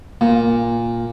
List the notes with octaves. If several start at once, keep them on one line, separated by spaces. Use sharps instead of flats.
A#2